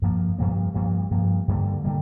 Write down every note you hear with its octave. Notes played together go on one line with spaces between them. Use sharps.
G2 F3 A#3
G2 F3 A#3
G2 F3 A#3
G2 F3 A#3
G2 D3 G3 A#3
D3 G3 A#3